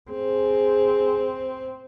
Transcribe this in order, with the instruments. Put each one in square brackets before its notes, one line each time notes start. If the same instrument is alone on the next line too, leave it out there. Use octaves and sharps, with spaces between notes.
[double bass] C4 [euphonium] G#4